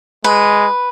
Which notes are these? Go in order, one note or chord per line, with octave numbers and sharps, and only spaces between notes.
G#3 B4